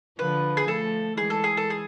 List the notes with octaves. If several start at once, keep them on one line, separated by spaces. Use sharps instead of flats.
D3 F3 B4
G#4
F3 A3 A4
E3 G#3 G#4
A4
G#4
A4
G#4